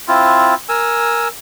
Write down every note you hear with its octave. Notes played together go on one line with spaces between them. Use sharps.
C4 E4 F4
A#4 G#5 E6